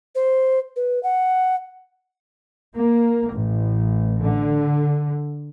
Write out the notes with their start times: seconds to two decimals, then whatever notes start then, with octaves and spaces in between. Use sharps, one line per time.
0.15 C5
0.76 B4
1.03 F#5
2.75 A#3
3.32 A1
4.23 D3